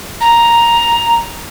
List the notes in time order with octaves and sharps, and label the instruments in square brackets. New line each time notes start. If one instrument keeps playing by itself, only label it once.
[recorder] A#5